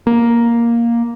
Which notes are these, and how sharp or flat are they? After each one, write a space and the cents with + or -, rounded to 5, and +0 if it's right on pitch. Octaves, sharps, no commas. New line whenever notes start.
A#3 +5